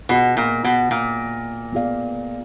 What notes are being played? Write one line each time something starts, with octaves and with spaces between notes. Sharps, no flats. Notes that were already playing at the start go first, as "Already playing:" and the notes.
B2 B3 F4 G#4 D#5
A#2
B2
A#2
B3 F4 G#4 D5 F5